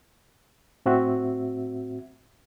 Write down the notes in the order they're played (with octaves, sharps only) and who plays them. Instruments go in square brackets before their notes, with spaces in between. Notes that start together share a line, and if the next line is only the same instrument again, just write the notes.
[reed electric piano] A2 C4 F#4 E5